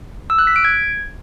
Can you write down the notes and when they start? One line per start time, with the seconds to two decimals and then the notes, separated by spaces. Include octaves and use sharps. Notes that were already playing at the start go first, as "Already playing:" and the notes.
0.30 E6
0.39 F#6
0.47 B6
0.56 D7
0.65 G#6